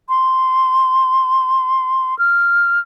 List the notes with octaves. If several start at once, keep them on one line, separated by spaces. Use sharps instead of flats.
C6
F6